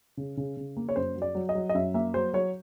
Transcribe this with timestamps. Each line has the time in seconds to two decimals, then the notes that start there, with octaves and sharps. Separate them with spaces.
0.17 C#3
0.37 C#3
0.57 C#3
0.77 A#3
0.89 C#5
0.96 F#2 C5
1.15 F#3
1.22 D5
1.35 F#3
1.49 D#5
1.55 F#3
1.69 D#5
1.74 F#2 E5
1.94 A#3 E5
2.14 F#3 C5
2.33 F#3 C#5